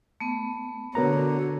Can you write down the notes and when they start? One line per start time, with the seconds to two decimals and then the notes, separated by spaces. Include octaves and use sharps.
0.20 A3 B3
0.95 D3 B3 F#4 A#4 C#5 A#5